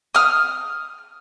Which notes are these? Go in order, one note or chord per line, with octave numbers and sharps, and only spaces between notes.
D#6 F6